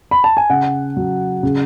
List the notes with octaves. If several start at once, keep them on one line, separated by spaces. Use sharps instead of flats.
B5
A5
G#5
C#3 F#5
F#3
C#3